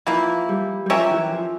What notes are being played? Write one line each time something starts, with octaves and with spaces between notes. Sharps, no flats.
E3 F3 A#3 E4
G3
G3
F3 C#4 G4 A#4 E5
E3
F3